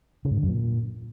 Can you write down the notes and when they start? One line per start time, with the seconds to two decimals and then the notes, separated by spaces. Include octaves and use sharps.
0.25 C#3
0.31 G#2
0.37 D3
0.43 F#2
0.49 A#2